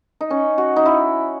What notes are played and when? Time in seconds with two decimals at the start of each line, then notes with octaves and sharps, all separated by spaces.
0.21 D#4
0.30 C#4
0.58 F#4
0.76 D#4
0.86 E4